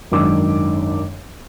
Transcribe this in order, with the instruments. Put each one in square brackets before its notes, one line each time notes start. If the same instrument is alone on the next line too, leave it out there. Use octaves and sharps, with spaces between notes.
[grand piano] G#1 F#2 D#3 D4 D6 E6